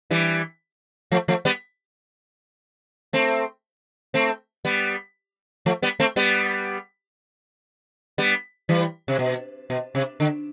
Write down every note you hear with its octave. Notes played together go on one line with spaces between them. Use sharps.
E3 G3
F3 A3
F3 A3
G3 B3
A3 C4
A3 C4
G3 B3
F3 A3
G3 B3
A3 C4
G3 B3
G3 B3
E3 G3
C3
B2
B2
C3
D3